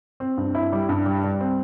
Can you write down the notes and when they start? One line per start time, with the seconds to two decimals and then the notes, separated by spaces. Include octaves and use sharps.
0.20 C4
0.38 G2
0.55 E4
0.73 G3
0.89 G2
1.06 G3
1.24 G3
1.41 C4